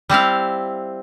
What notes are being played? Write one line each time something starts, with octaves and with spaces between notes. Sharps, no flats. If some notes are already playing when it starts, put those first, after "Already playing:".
G3 C4 E4 F5